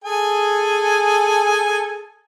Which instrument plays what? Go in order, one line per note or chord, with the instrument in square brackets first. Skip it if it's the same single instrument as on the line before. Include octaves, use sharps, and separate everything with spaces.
[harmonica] G#4 A4 G#5